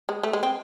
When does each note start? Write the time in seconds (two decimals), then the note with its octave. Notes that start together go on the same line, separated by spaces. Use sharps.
0.09 G#3
0.23 A3
0.33 G#3
0.43 C4